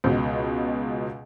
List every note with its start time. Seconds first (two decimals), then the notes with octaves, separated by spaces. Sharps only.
0.04 C#2 B2